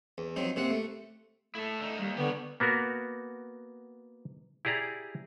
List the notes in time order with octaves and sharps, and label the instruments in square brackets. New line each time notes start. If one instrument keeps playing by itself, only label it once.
[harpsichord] E2
F3 F#3 C4 D#4
C3 A#3 C4 F#5
A3
[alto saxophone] A3 [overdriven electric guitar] E4 A4
[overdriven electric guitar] D3 D#4
[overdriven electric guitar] D#2 [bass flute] G3
[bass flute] D3 [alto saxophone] B3 [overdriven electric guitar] G4 C#5
[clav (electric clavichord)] A#3 B3 F#4 A#4
E4 G4 G#4 D5 A#5